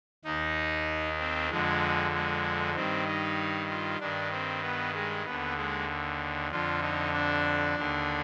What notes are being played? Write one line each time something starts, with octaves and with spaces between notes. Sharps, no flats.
D#2 D#3 D#4
C4
F2 D3 G#3
G#3
G2 D#3 C4
D#4
F4
G2 D#3 D4
C4
B3
G#3
D#2 D3 B3
G#3
F2 D3 F4
D#4
D4
D#2 D3